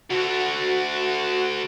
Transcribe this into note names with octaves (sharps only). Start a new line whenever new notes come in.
D2 D3 F#4